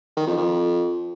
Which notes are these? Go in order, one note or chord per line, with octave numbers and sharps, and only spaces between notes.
D#3
F2
F2